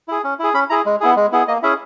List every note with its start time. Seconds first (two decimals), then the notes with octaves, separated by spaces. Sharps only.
0.08 E4 G#4
0.24 C#4
0.39 E4 G#4
0.54 C#4 B5
0.70 E4 G#4 A#5
0.86 G#3
1.00 B3 E4 G#4
1.16 G#3
1.33 B3 E4 G#4
1.48 A#3 D#5
1.63 C#4 E4 G#4 E5